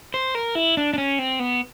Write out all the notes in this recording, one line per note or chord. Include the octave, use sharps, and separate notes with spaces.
C5
A#4
E4
D4
D4
C#4
C4
B3